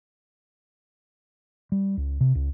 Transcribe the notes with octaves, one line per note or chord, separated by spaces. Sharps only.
G3
C#2
C3
C#2